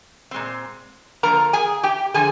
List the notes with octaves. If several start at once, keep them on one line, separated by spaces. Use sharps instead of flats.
A#2 G#3 C4
D3 F3 A#3 A#4 A#5
G#4 G#5
G4 G5
D3 F3 G#4 G#5